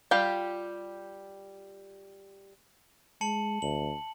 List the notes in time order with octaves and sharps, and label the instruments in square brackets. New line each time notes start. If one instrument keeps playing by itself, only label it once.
[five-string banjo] G3 F4 G4 G5
[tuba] G#3 [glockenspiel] A5 C#7 F#7
[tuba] D2 [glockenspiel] F#7